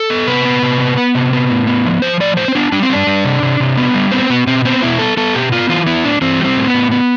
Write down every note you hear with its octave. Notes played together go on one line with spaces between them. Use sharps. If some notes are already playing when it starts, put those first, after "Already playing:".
Already playing: A4
B3
C3 B4
B3
C3
B3
B3
C3
B3
A2
B3
F3
F3 C5
A2 D5
A2 C5
C4
B3 D4
G3 D4
C4
G3 D4
G3
C3
C3
C3
B3
G3
B3 C4
B2 B3
B2 C4
B3 C4
B2 E4
B3 A4
B3 A4
B2 G4
B3 F4
E3 F4
B3 E4
A2 D4
E3 C4
G3
C4
A2
B3
A2
B3